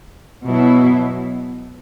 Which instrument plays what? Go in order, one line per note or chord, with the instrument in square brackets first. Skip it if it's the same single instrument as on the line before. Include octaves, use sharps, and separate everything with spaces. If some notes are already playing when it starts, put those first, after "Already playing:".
[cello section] B2 F#3 E4